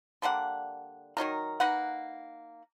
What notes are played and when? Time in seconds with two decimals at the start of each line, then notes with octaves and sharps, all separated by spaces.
0.22 D3 G3 A#3 F#5
1.17 D#3 F#3 D#4 A#4
1.60 A#3 D#4 B4 F#5